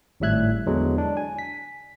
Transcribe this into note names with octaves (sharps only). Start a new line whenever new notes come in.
G#1 A2 G3 E5 F#6 G#6
E2 D3 E3 F#3 G#3
D4
G#5
B6